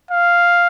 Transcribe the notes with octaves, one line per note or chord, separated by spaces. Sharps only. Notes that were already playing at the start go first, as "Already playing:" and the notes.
F5